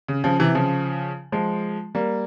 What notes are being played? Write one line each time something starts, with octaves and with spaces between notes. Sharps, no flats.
C#3
C#3 F3
C3 E3
C#3 F3
F3 G#3
G3 A#3